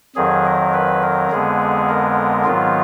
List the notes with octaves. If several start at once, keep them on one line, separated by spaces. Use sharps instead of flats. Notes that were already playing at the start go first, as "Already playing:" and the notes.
F2 D#3 F#3 G#4
A#4
B4
A#4
F2 D3 G#3 B3 G#4
A#4
G#2 D#3 F#3 B3 F4